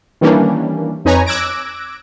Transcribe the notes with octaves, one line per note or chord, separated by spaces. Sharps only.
D#3 E3 G3 A#3 C#4 D4
F2 D#4 B4 C#5 G#5 A#5
D6 E6 F#6 G#6 A#6 D7